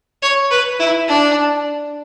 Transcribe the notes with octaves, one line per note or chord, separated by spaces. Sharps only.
C#5
B4
E4
D4